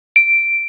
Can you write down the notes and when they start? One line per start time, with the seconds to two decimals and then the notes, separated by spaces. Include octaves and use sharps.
0.16 D7